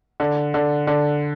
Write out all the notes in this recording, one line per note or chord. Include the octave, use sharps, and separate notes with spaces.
D3
D3
D3